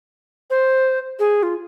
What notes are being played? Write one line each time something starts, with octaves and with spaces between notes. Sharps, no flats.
C5
G#4
F4